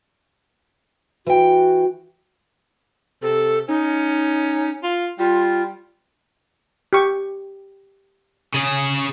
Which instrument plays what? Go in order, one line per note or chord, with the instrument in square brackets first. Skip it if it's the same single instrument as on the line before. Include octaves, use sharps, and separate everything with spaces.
[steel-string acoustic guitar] E3 G5 [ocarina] F#4
[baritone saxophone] C3 [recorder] A4
[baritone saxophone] C#4 [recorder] D#4
[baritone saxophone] F4
[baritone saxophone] G3 [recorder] F4
[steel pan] G4 C#6
[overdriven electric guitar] C#3 G#4